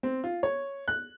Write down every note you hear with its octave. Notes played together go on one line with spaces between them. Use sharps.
C4
F4
C#5
F#6